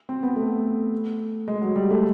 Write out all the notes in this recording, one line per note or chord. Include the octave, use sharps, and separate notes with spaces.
C4
B3
A3
G#3
F#3
G3
A3